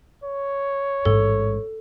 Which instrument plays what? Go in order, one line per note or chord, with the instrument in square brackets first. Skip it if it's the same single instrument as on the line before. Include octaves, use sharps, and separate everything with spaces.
[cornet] C#5
[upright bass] A1 G#2 [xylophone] A4